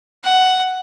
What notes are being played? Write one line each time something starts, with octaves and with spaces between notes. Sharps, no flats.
F#5